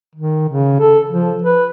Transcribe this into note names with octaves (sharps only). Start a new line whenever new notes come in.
D#3
C#3
A4
F3
B4